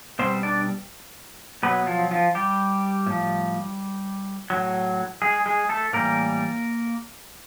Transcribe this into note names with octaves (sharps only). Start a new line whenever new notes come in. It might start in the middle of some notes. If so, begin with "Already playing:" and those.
B2 G3 C4 C5
D4 D5
B2 F#3 B3 B4
F3 F4
F3 F4
G3 G4
A2 F3
A2 F#3
G#3 G#4
G#3 G#4
A3 A4
A2 E3 G3 A#3 A#4